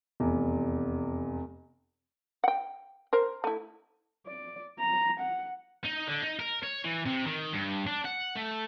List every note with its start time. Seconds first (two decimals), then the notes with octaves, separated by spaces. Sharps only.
0.20 F1 E2
2.44 F#5 G5
3.13 A#4 C5
3.44 A3 E4
4.26 D5
4.80 A#5
5.20 F#5
5.85 D#4
6.07 D3
6.22 D#4
6.39 A#4
6.63 C#5
6.85 E3
7.06 C3
7.26 D#3
7.53 G2
7.87 D4
8.05 F#5
8.35 A3